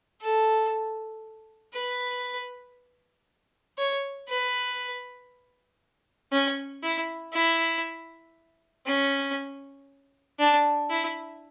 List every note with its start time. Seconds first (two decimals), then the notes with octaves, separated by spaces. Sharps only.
0.21 A4
1.74 B4
3.78 C#5
4.29 B4
6.32 C#4
6.83 E4
7.33 E4
8.87 C#4
10.39 D4
10.90 E4